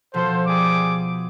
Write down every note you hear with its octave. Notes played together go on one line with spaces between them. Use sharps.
B2 F3 A4 C5
G3 G#4 D6